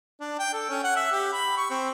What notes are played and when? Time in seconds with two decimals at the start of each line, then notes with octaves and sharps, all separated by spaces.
0.20 D4
0.39 G5
0.53 A4
0.69 C#4
0.84 F#5
0.96 E5
1.12 G4
1.33 B5
1.57 C#6
1.70 C4